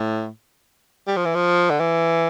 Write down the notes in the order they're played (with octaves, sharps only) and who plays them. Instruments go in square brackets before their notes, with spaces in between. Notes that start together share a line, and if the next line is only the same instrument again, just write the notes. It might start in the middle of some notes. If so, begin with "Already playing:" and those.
Already playing: [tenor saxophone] A2
G3
F3
E3
F3
D3
E3